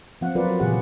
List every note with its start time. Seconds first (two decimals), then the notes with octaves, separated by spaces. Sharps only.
0.21 F3 C4 F5 F#5
0.35 F#3 F4 A#4 B4 D5
0.60 A#2 C#3 E3 G4 G#4 F#5